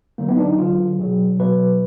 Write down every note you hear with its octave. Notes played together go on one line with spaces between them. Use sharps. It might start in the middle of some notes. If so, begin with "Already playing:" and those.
D3 F#3 A#3
B3
D#4
D4
D#4
D3 F#3 F4
B2 F#3 G#4
B2 F#3 B4